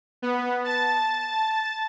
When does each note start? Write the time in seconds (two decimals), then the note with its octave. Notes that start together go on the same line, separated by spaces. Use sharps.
0.22 B3
0.65 A5 A6